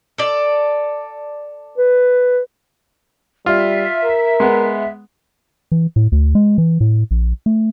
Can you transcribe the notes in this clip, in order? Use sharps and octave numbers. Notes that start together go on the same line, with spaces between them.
A4 D5
B4
G3 F4 E5
A#4
G#3 B3
E3
A2
D2
G#3
E3
A2
A#1
A3